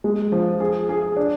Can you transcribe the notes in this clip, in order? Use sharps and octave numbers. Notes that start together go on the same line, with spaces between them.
G#3
F3
G#4
G#4
D4